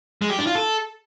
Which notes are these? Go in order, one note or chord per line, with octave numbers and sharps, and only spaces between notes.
G#3
G4
D4
F4
A4